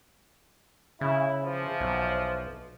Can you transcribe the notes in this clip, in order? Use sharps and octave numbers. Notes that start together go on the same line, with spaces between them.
C#3 E4
E3 F3
B1